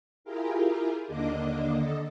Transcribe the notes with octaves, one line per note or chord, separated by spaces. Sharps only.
E4 F4 G4 G#4 A#4
D#2 D3 A#3 D4 D#5 D6
D3 A4 D#5